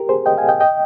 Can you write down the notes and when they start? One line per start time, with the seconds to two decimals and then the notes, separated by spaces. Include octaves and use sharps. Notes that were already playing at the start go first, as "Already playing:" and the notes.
Already playing: G4 A#4
0.09 G#4 C5
0.26 D#5 G5
0.38 F5 G#5
0.49 D#5 G5
0.60 D#5 G5